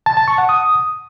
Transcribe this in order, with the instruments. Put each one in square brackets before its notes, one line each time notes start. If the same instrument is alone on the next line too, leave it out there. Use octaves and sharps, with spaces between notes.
[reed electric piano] A5
A5
C#6
F#5
D#6